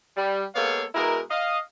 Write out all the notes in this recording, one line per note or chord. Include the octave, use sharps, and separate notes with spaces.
G3
G#3 A#3 B3 A4 C#5 F5
B2 G#3 E4 A#4
D#5 F5